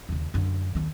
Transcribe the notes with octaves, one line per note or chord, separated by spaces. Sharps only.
D#2 C#3
F#2 D3
D#2 D#3